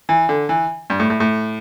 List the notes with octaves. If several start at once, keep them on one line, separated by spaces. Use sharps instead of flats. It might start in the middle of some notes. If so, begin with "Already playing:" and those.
E3
D3
E3
G2
A2
A2
A2